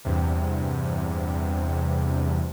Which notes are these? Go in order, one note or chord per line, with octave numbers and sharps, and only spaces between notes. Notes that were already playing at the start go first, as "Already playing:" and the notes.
E2 G2 C3